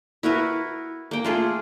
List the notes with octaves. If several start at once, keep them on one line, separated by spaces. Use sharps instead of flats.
E4 F#4 A#4 B4
A#3 G5
A3 F4 G#4